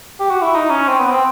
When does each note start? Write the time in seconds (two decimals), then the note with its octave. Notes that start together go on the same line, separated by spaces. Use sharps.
0.20 G4
0.30 F#4
0.42 E4
0.54 D#4
0.71 C#4
0.88 C4
1.00 B3
1.11 C4